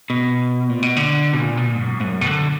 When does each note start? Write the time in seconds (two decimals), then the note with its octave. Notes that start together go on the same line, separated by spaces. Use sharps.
0.10 B2
0.70 A#2
0.83 B2
0.97 D3
1.33 B2
1.39 A#2
1.57 B2
1.66 A#2
1.75 G#2
1.82 F#2
2.00 G#2
2.04 F#2
2.21 B2
2.27 D3